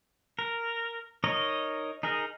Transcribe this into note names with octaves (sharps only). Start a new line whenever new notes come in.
A#4
D#4 A#4 C#5 D#5
D#4 G#4 A#4